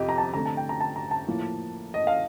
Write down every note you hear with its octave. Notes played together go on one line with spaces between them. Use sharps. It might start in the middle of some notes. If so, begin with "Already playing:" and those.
Already playing: F2 C3 G4 D#5
A#5
A5
D3 A3 C4 A#5
A5
G5
A#5
A5
A#5
A5
A2 F3 A#3
D#5
F5